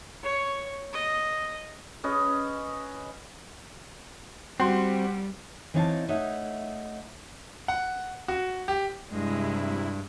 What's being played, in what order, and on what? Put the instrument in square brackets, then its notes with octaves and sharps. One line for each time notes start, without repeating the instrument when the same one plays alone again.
[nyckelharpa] C#5
D#5
[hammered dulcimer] C#4 B4 D#5
[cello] G3 [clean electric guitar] C4 [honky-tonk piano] F#4 C6
[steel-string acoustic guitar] E3 C4 D#4 C#5 F5 A5
A3 D#4 C#5 E5 F#5
[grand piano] F#5
F#4
G4
[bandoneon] G2 [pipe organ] C3 E4 [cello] G#3